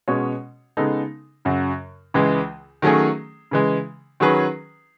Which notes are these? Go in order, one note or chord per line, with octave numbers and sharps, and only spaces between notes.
B2 G#3 C#4 F#4 C#5
C#3 G#3 B3 D#4 A4
F#2 C#3 F#3
C#2 C#3 E3 G#3
D#3 F#3 A3 C#4 G#4
C#3 E3 G#3
D#3 F#3 C#4 G#4 B4